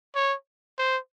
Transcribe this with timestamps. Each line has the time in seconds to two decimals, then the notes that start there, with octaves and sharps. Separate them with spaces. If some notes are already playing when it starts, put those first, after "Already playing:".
0.15 C#5
0.79 C5